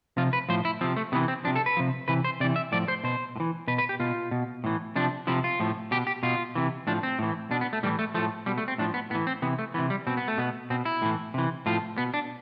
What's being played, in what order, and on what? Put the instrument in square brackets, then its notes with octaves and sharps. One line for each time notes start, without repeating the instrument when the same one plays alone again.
[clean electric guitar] C3 F3 F4
B4
A2 F3 C5
E4
C3 F3 C4
A3
C3 E3 B3
C4
C3 F3 D4
A4
B4
C3 F3
C3 E3 B4
C5
C3 D5
E3
E5
A2 F3 D5
C5
B2 C5
A2
E3
B2 B4
B4
G4
B2 F4
B2
A2 E3
C3 F3 D4
C3 F3 E4
F4
A2 F3
B2 G4
G4
B2 F4
C3 E3
A2 F3 D4
C4
A2 E3
B2 D4
B3
A3
A2 E3 G3
A3
A2 F3 A3
B2 G3
A3
C4
A2 F3 D4
B3
A2 B3
E3
C4
C3 E3 B3
A3
E3 B3
C3
G3
B2 C4
B3
A3
B2 B3
B2 C4
E4
A2 E3
C3 E3
A2 F3 F4
B2 B3
D4